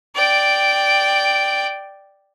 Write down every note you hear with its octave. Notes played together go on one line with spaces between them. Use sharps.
D5 G5